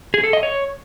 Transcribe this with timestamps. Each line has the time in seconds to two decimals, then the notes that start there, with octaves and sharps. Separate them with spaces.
0.14 G#4
0.24 A4
0.33 D#5
0.43 C#5